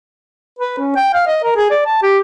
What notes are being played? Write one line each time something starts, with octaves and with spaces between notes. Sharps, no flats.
B4
C#4
G5
F5
D#5
A#4
G#4
D5
A5
G4